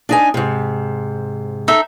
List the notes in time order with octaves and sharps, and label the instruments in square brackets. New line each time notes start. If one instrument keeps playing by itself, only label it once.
[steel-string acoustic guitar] D4 D#4 G#5
G#2 C3
[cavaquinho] D#4 A4 E5